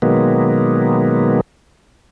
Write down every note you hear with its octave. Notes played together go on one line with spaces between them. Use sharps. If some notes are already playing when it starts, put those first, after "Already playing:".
B2 D#3 F#3 G#3 A#3 B3